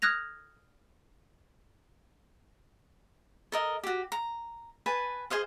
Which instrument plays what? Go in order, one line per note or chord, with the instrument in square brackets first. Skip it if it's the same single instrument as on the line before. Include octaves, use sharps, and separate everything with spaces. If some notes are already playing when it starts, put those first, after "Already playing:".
[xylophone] D#6 F6 F#6 G#6 A#6 F7
[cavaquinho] A4 A#4 D#5
F#4 G4
A#5
B4 G#5 A5
G#4 C5 D#5 F5